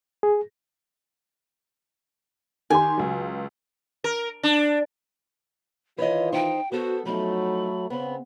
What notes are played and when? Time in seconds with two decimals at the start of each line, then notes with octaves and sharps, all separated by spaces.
0.23 G#4
2.70 D#3 G4 G#5 C6
2.98 C#2 F#3
4.04 A#4
4.43 D4
5.98 D#3 E3 F4 B4 C#5 D#5
6.32 D#4 C5 G5
6.72 B3 F#4 A4 C5
7.05 F3 F#3 A3 D#4 B5
7.90 C#3 B3 C4 B5